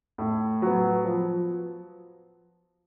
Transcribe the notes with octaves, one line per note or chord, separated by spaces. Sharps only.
A2
F#3 B3
F3